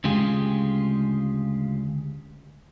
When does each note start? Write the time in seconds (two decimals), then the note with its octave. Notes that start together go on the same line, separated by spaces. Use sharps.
0.04 D2 C#3 G#3 F4 G4 G#4